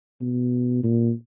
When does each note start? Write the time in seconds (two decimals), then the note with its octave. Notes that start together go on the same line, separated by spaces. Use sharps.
0.21 B2
0.83 A#2